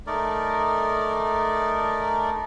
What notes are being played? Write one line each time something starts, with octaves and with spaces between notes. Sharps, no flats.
A3 D#4 A#4 D5